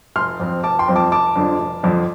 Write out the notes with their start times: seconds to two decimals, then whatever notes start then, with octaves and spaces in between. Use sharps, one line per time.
0.16 F1 C6 F6
0.40 F2 F3 C4
0.64 F1 A5 D6
0.79 G5 C6
0.88 F2 F3 C4
0.96 A5 D6
1.11 F1 A5 D6
1.36 F2 D3 F3 D4
1.59 F1
1.83 F2 D3 F3 D4